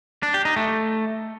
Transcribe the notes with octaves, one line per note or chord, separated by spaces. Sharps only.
D4
G4
D#4
A3